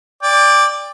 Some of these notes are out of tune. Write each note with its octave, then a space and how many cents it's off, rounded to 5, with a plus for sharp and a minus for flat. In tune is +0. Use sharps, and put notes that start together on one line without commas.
D5 +0 G5 +30